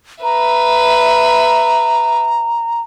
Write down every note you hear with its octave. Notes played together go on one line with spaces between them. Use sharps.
B4 E5 A#5